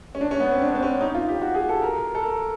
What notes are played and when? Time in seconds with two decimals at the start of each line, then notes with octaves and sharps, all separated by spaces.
0.15 C#4
0.21 D4
0.31 C#4
0.40 B3
0.51 C4
0.62 D4
0.69 C#4
0.75 C4
0.82 C#4
1.01 D#4
1.15 F4
1.28 G4
1.42 F#4
1.54 G#4
1.69 A4
1.82 A#4
2.15 A4
2.22 A#4